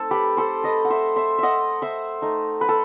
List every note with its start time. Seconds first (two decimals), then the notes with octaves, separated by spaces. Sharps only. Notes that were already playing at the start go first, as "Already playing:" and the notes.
Already playing: A3 C4 D#4 A4
0.11 G4 B4
0.37 A4 C5
0.64 B4 D#5
0.85 F#5
0.90 C5 E5
1.16 C5 E5
1.38 D#5 E5 F#5
1.82 C5 E5
2.22 A3 D#4
2.61 B4
2.69 A4